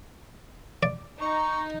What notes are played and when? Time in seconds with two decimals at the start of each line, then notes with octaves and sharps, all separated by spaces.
0.83 D5
1.21 D#4 C#6